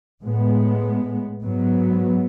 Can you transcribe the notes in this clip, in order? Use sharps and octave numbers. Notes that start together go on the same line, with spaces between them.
A2 G#3 B3
G#2 F#3 B3